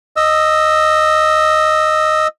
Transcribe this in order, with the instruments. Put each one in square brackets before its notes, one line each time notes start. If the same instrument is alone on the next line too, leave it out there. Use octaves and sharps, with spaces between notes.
[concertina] D#5 E6